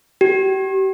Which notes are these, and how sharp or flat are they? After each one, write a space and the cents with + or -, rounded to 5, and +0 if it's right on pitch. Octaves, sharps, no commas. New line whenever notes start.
G4 -35